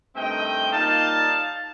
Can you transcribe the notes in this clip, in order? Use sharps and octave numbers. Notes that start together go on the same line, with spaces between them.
G2 D#3 A3 C4 D#5 G5
A#2 G3 A#3 D#4 F5 A5